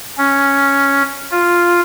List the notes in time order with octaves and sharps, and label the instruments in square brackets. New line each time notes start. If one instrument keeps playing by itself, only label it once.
[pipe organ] C#4
F4